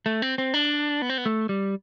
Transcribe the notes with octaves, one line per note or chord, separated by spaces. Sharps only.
A3
C4
C4
D4
B3
C4
B3
A3
G3